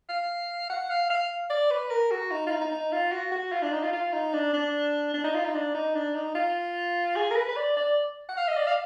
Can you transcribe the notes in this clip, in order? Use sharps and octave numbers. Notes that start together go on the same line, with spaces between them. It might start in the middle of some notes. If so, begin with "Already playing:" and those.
F5
F#5
F5
F5
D5
B4
A#4
F#4
D#4
F4
D#4
D#4
D#4
F4
F#4
F#4
F4
D4
D#4
F4
F4
D#4
D4
D4
D4
D#4
F4
D#4
D4
D#4
D4
D#4
F4
G#4
A#4
B4
B4
D5
D5
F#5
F5
D#5
D5
F5